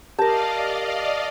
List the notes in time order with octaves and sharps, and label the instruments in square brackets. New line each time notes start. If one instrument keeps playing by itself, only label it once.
[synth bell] G4 A#4 [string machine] D5 D#5 F5 [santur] A5